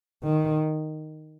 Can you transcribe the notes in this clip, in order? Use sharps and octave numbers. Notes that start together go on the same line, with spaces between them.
D#3